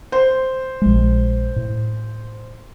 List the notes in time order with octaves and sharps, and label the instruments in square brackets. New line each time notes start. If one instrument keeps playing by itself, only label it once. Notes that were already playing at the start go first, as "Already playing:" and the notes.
[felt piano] C5
[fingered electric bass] A#1 G#3
A2